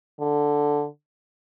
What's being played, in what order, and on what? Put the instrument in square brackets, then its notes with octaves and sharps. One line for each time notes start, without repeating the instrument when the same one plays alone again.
[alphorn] D3